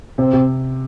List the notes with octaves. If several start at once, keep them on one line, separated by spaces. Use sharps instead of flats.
C3 C4
C3